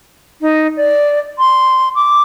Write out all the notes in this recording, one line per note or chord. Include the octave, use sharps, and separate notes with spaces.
D#4
D5
C6
D6